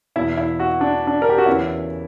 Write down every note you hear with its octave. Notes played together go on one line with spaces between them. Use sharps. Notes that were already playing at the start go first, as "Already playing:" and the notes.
E2 B2 E4
E4
F#4
D4
D4
A#4
G4
F#4
E2 C#3 E3 E4